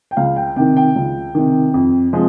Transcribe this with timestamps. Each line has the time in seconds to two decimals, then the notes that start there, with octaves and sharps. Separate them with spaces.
0.11 G5
0.17 C#2 F5
0.37 G5
0.56 C3 D#3 G5
0.77 G5
0.96 C#2
1.35 C3 D#3
1.74 F2
2.13 C3 F3 G#3